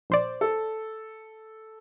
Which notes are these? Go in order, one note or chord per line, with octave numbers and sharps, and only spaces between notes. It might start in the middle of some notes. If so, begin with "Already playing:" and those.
A#1 C5 D5
A4